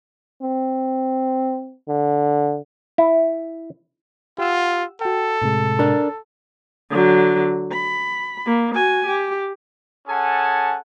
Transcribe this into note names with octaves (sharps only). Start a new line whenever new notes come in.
C4
D3
E4
F4 G4 F#5 E6
F#4 A4 G5
A2 C3 G#3
D4 A#4
D3 F#3
B5
A#3
F#4 G#5
G4
C#4 G#4 A4 F#5 G#5 A5